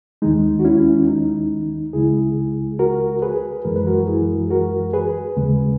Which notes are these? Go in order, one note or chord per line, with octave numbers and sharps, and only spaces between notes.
D#2 D#3 G#3 D#4
F#4
C#4 E4
D#4
C#2 C#3 G#3 E4 G#4
F#4 A#4
G#4 B4
F#2 E3 G#3 A#4
B4
F#4 A#4
E4 G#4
F#4 A#4
G#4 B4
D#2 C#3 G#3